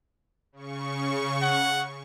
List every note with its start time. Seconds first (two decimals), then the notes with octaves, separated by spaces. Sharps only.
0.52 C#3 C#6
1.42 F#5